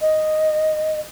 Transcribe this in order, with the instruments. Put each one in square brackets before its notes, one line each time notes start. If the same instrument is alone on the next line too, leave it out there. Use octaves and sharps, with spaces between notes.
[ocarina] D#5